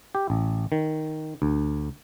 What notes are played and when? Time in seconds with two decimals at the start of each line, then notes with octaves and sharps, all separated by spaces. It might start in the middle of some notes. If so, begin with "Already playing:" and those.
0.15 G4
0.30 A1
0.72 D#3
1.42 D2